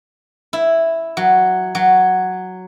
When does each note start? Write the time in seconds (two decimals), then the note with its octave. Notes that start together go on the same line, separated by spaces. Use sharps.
0.53 E4
1.17 F#3
1.75 F#3